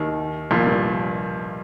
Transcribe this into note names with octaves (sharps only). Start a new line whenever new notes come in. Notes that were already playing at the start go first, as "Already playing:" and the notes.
Already playing: D#2 D#3
A#1 A#2
G2